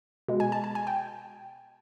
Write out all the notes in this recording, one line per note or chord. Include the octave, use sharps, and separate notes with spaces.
B2 G#3
G#5
A5
A5
G#5
G5